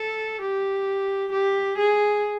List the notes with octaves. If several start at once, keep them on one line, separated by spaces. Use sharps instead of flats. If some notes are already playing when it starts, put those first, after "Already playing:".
Already playing: A4
G4
G4
G#4